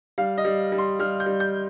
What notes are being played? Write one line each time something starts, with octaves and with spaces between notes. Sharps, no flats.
G3 F5
D#5
G3
G3
C6
G3 F6
G6
G3
G6